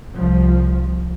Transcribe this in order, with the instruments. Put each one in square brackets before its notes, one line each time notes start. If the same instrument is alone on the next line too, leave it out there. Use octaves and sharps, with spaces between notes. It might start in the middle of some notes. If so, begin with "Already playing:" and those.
[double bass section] C2 F3